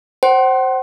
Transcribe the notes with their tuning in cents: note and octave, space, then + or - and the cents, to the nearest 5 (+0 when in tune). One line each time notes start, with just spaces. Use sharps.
C5 +10 F#5 +40